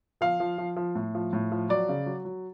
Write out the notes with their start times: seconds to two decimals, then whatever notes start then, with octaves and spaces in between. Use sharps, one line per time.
0.21 F3 F5
0.40 F3
0.58 F3
0.76 F3
0.95 A2
1.15 F3
1.33 A2
1.52 F3
1.69 F#3 D5
1.89 C#3
2.06 F#3
2.25 F#3